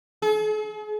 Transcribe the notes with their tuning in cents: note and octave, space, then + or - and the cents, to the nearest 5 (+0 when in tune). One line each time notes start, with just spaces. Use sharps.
G#4 +45